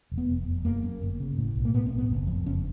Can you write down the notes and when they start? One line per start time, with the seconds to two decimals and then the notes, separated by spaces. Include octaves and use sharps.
0.12 F1
0.18 B3
0.29 F1
0.48 F1
0.65 F#2 A#3
0.83 F#2
1.02 G1
1.20 C#3
1.38 A2
1.56 B1
1.65 A#3
1.74 A2 B3
1.86 C4
1.91 B1
1.98 B3
2.09 F#1
2.27 F2
2.46 F#1 C#4